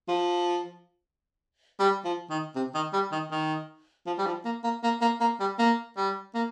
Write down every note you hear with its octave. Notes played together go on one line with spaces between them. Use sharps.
F3
G3
F3
D#3
C3
D#3
G3
D#3
D#3
F3
G3
F3
A#3
A#3
A#3
A#3
A#3
G3
A#3
G3
A#3